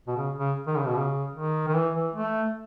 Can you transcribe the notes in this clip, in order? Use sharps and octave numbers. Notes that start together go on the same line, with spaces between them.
B2
C#3
C#3
D#3
C#3
B2
C#3
D#3
D#3
E3
E3
A3